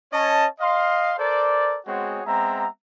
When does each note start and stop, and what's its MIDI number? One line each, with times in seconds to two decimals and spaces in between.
0.13 0.46 61
0.13 0.46 73
0.13 0.46 75
0.13 0.46 81
0.60 1.13 75
0.60 1.13 77
0.60 1.13 84
1.19 1.78 69
1.19 1.78 70
1.19 1.78 72
1.19 1.78 74
1.86 2.21 56
1.86 2.21 59
1.86 2.21 60
1.86 2.21 66
1.86 2.21 68
1.86 2.21 73
2.26 2.66 56
2.26 2.66 59
2.26 2.66 60
2.26 2.66 76
2.26 2.66 82